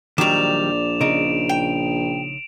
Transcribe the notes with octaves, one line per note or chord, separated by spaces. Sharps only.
A#1 D#3 F#3 G3 D5 D6 E7 F7
C#3 D#4 D7
G5